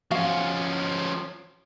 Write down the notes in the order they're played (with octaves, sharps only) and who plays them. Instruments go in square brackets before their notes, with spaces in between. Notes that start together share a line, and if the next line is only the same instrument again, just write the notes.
[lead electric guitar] F3 C#4 [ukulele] F#4 F5